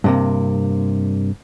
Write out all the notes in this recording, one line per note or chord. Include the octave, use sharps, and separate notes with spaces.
G2 C3 A#3